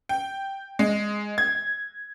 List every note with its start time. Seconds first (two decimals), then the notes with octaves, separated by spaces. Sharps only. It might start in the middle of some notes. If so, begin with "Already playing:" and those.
0.09 G5
0.79 G#3
1.38 G#6